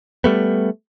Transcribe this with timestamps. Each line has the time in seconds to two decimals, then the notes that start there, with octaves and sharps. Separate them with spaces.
0.24 G3 A3 B3